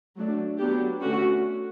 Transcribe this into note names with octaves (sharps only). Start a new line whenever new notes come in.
F#3 A3 D4
F#3 B3 D4 G4
D3 A3 C#4 F#4